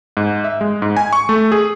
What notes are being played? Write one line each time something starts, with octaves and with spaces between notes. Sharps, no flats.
G#2
E5
G#3
G#2
G#5
C#6
A3
G#4